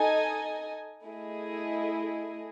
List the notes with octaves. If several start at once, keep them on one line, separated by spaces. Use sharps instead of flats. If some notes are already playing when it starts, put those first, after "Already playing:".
Already playing: D#4 A4 D#5 G#5
A3 E4 G#4 D#5